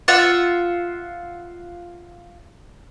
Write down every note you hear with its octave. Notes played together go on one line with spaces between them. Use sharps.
F4 E5 F#5